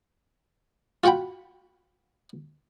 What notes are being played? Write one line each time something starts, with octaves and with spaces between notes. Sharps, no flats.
F4 F#4 F#5 G5 B5